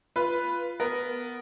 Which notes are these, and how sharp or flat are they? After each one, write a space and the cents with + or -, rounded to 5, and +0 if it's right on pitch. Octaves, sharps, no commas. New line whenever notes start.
F4 -15 B4 +0
B3 +0 A#4 +0